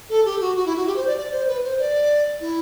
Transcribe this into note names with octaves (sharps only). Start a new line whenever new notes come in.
A4
G4
F#4
F#4
E4
F#4
G4
C5
D5
D5
C5
B4
C5
D5
E4